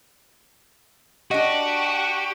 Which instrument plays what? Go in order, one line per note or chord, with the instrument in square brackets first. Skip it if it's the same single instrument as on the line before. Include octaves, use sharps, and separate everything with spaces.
[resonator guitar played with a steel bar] D4 D#5 [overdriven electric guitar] F#4 [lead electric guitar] G4